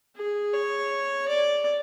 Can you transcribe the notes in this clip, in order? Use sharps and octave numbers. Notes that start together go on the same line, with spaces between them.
G#4
C#5
D5